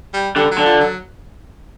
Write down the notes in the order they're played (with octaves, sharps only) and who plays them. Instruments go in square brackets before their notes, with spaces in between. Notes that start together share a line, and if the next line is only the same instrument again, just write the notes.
[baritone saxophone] G3
[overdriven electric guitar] D3 [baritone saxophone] G3
[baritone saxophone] F#3
[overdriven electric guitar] D3
[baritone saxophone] F3
F#3